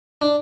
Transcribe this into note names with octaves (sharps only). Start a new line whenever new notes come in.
D4